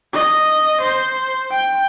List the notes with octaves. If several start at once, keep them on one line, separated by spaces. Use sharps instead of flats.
D#5
C5
G5